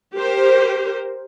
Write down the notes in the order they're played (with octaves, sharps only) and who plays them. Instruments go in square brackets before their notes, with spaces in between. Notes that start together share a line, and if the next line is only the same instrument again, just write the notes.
[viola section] G4 A#4 C5